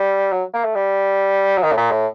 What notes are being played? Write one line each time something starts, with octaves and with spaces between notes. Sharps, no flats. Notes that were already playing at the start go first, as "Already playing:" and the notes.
Already playing: G3
F#3
A#3
A3
G3
F#3
D#3
A2
A#2
A2